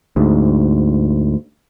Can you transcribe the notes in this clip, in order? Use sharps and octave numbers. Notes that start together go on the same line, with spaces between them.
D2 G#2